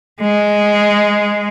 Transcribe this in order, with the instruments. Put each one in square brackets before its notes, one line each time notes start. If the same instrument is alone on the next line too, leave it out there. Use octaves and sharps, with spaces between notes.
[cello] G#3